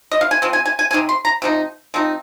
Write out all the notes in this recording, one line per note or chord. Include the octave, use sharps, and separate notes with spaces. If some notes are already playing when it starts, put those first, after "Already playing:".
D#5
F5
G#5
F3 C4
G#5
G#5
G#5
C3 G#3 D#4 G#5
C6
A#5
C3 F3 D#4
F3 C4 D#4